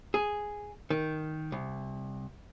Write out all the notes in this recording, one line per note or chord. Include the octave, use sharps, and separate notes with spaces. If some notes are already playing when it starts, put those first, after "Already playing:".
G#4
D#3
C2